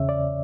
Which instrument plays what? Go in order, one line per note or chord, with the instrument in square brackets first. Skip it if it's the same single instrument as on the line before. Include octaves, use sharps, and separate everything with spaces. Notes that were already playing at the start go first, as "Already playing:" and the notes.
Already playing: [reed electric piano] E2 C#3 C#5 E5
D5